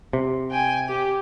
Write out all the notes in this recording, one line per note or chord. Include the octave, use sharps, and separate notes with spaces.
C3
G5 G#5
G4